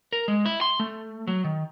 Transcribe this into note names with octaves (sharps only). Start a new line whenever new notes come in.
A#4
G#3
E4
C6
A3
F#3
D#3